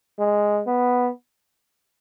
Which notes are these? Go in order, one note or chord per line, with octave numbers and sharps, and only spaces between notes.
G#3
B3